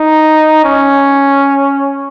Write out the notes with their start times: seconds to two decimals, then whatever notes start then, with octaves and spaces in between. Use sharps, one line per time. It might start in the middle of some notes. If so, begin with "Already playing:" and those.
Already playing: D#4
0.64 C#4